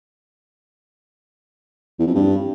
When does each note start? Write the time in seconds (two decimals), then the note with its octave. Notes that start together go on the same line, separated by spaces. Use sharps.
1.99 E2
2.07 F2
2.15 G2